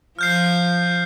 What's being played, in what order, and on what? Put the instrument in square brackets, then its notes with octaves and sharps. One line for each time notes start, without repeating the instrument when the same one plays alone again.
[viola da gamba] F3 [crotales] F6 G6 C7